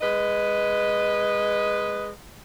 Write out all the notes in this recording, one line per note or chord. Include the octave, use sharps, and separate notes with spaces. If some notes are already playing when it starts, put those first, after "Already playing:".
G#3 B4 D#5